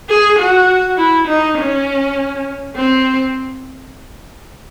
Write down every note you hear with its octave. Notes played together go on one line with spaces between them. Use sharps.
G#4
F#4
E4
D#4
C#4
C4